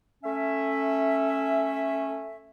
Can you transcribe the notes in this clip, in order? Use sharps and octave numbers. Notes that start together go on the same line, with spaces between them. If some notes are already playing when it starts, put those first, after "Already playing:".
A3 C#4 E5